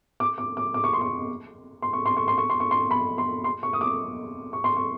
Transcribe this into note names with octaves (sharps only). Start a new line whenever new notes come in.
D6
D6
D6
D6
C#6
C6
C#6
C6
C#6
C6
C#6
C6
C#6
C6
C#6
C6
B5
C6
C6
C#6
D#6
D6
C#6
C6
C#6